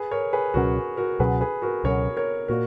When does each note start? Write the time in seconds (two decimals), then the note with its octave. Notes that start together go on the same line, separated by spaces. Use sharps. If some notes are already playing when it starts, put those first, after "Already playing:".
Already playing: G#4 B4
0.11 A#4 C#5
0.33 G#4 B4
0.54 C#2 B2 F#3 C#4 F#4 A#4
0.97 F#4 A#4
1.19 C#2 B2 F#3 C#4 G#4 B4
1.41 G#4 B4
1.62 F#4 A#4
1.84 C#2 B2 F#3 C#4 A#4 C#5
2.17 A#4 C#5
2.48 A#2 A#3 F#4 A#4